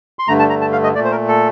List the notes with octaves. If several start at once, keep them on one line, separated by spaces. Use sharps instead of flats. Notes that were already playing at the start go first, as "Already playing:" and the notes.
C6
G2 D3 A3 A#5
A5
A#5
A5
F5
D#5
A#2 A3 D5
C5
A#4
A4